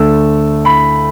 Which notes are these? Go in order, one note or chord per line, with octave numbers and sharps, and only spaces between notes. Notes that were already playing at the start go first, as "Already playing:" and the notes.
Already playing: D2 D3 A3 E6
B5